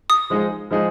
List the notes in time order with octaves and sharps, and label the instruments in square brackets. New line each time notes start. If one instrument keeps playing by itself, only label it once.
[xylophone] D#6
[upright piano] F3 G#3 D#4 G#4
F3 G#3 D#4 G#4